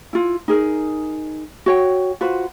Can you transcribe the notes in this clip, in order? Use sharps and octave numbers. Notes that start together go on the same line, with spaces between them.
E4 F4
D#4 G#4 A#4
F#4 C#5 G5
F4 F#4 B4 C5